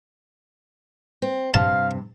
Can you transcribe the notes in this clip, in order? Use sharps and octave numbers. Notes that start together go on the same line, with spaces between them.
C4
G2 C3 F5 A5